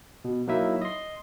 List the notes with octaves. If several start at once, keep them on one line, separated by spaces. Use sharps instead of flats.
B2
F#3 A#3 D#4 E4 E5
D#5 C6